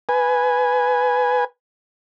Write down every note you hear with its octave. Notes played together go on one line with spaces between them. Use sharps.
B4 G#5